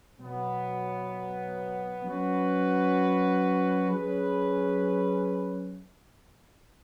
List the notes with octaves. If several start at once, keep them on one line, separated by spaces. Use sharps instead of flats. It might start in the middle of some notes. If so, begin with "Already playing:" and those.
B2 F#3 B3
F#3 C#4 F#4 B4
F#3 C#4 G#4 B4